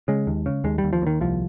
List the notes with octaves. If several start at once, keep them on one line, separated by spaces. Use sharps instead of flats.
C#3 G#3
D#2
C#3
D#2 G#3
G3
D#2
F3
D#2 D#3
C2 F3